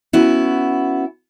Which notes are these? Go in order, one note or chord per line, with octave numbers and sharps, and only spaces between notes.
B3 C#4 E4 F#4